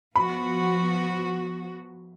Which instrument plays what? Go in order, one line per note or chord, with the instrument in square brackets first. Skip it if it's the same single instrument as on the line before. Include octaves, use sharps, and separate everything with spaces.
[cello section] F3 B3 F#4 [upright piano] B5